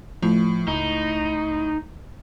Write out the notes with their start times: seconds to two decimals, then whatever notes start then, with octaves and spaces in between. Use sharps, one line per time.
0.22 A2 F3
0.68 C#2 D#4